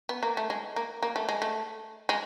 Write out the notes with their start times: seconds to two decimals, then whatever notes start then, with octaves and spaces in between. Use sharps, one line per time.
0.09 B3
0.23 A#3
0.37 A3
0.50 G#3
0.76 A#3
1.03 A#3
1.16 A3
1.29 G#3
1.42 A3
2.09 G#3